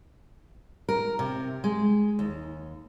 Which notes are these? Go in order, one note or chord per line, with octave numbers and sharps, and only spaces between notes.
A#4
C3
G#3
D#2